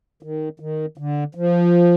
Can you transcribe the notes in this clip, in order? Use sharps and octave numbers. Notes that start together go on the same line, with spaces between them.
D#3
D#3
D3
F3